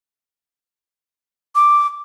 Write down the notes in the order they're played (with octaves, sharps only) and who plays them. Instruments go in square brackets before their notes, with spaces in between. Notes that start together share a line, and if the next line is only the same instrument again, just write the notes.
[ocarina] D6